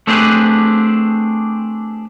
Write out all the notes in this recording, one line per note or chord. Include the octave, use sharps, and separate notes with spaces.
A3 C4 D4 G4 G#4 B4